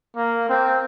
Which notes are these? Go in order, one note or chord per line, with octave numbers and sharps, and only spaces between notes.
A#3
C4